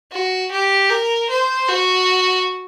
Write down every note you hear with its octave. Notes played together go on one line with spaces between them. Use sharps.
F#4
G4
A#4
C5
F#4